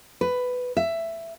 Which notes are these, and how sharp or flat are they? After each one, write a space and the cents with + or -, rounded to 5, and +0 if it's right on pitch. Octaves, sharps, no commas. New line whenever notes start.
B4 +10
E5 +10